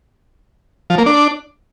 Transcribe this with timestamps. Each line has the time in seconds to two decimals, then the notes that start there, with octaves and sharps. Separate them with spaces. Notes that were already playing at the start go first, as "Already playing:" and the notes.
0.90 F3
0.98 A#3
1.06 D4